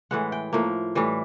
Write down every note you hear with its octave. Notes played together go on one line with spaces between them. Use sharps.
A2 E3 G#3 F#5
G5
A2 F3 A#3
A2 E3 G3